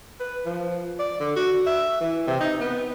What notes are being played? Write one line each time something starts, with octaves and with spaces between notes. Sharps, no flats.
B4
F3
D5
D3
F#4
E5
E3
C3
D#4
B3